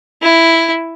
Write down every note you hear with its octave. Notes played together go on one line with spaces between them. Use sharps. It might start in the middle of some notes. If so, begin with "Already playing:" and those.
E4